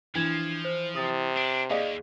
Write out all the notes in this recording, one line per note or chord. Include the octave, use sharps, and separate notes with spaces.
E3 F3 D4 G#6 E7
C5
C3 D#6 A6
D4
D#2 G#4 D5 D#5 F5